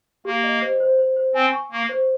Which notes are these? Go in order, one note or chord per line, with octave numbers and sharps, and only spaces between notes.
A#3 G4
D#5
C5
C5
C5
C5
C4 G#5
C#6
A#3 C#6
C5